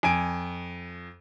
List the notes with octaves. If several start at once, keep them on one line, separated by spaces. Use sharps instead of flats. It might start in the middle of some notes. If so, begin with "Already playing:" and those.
F2 G#5 D7